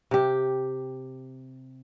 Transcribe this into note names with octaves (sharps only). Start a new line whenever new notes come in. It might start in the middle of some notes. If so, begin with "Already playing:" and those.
C3 G4